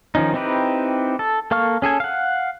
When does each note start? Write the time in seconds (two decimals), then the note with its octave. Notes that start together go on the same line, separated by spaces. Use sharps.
0.15 D#3 F3 C#4 D#4
0.34 C4 D#4 E4 G4 B4
1.19 A4
1.51 A#3 A4 F5 C#6 F6
1.82 C#4 G#4 A4 G#5
2.00 F5 F#5